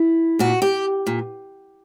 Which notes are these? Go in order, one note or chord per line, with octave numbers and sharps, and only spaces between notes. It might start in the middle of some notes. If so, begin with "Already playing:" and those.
Already playing: E4
A#2 F#4
G4
A#2